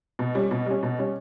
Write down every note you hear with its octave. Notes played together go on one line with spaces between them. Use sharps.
B2
G3 C#4
B2
G3 C#4
B2
G3 C#4